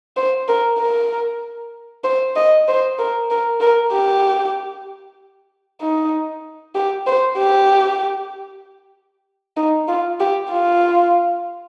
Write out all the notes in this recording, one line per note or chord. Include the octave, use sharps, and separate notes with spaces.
C5
A#4
A#4
C5
D#5
C5
A#4
A#4
A#4
G4
D#4
G4
C5
G4
D#4
F4
G4
F4